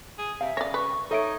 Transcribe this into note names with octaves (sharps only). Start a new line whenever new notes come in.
G#4
C3 E5 F5
C#3 C#5 D5 A#6
B4 C#6
D#4 A4 C#5 E5 D7